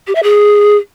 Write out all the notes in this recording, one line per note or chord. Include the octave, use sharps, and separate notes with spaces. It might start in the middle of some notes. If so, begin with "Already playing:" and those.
G4
E5
G#4